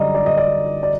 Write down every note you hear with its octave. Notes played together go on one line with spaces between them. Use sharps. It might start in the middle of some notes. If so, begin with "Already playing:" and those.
Already playing: F#2 D3 G3 D5 D#5 A#5
D5
D#5
D5
D5